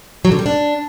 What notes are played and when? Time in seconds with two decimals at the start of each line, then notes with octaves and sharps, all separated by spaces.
0.25 F#3
0.32 D3
0.39 G3
0.46 D4